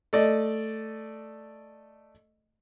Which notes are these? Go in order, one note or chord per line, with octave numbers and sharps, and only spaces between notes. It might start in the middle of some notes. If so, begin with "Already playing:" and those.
A3 D5 D#5